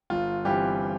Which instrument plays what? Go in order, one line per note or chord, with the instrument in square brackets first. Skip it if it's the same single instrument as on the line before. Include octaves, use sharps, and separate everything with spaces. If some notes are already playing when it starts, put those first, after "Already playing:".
[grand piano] G1 F4
G2 E3 G3 C4 G4